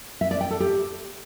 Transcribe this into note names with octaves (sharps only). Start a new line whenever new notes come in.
E5
D5
G5
A4
G4